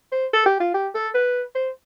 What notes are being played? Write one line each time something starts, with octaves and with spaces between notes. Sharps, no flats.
C5
A4
G4
F4
G4
A4
B4
C5